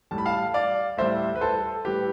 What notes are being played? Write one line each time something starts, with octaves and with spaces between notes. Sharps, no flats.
A2 G3 A5
B5
F5 A5
D5 F5
A2 G3 C5 E5
B4
A4 C5
A2 G3 G4 B4